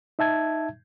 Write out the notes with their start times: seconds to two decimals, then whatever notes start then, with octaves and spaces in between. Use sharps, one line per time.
0.19 D#4 E5 A5 G#6